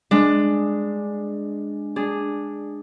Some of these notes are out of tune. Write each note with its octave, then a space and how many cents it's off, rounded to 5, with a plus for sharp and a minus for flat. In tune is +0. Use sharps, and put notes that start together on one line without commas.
G#3 +0 D4 +10
D4 +0 G#4 -10